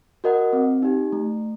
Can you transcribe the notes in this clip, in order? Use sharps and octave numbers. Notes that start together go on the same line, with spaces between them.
F#4 A#4 D#5 F#5
C4
D#4 G4
A3